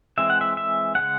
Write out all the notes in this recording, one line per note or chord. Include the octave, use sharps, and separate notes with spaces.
E3 G#3 C4 E5
F#5
E5
E5
C#3 G#3 C#4 F#5